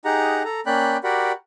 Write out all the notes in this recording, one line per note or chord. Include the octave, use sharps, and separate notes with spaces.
D#4 G4 G#4 F#5 A#5
A4 A#5
A#3 C#4 D5 G5 B5 F#6
F#4 G4 A#4 D5 F#5 B5